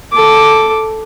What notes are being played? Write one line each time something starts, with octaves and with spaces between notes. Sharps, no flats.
A4 D6